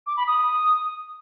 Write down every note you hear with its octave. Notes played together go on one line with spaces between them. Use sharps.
D6
B5
D#6